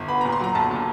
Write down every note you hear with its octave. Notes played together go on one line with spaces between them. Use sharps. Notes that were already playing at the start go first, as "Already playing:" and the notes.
Already playing: G1
B3 B5
A#2 A#5
C6
F#3 A#5
B1 A5
A#2